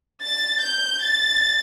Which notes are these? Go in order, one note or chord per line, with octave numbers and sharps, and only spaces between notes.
A6
G6
A6